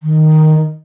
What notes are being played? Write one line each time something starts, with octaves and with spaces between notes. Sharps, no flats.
D#3